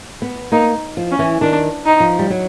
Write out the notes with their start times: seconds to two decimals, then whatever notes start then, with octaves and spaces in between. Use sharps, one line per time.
0.22 B3
0.52 A#3 D#4
0.97 F3
1.11 C#4
1.19 E3
1.41 D#3 D4
1.86 D#4
2.00 F3
2.19 G3
2.30 F#3